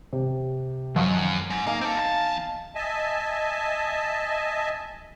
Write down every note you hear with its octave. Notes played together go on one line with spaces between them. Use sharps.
C3
F#2 D#3 F3 F#3
G#2
A#3 D#4 F5 G#5
C4 A4
E2 A5
D#5 E5 G#5 A5